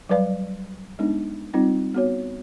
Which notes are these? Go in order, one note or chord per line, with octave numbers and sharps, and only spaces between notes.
F#3 G3 B4 D5 F5
G#3 B3 D4 D#4
G3 C4 D#4 F4
B3 F#4 C#5